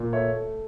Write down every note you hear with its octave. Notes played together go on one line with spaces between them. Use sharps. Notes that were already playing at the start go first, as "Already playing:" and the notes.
Already playing: A#2
A3 C#5 E5
A3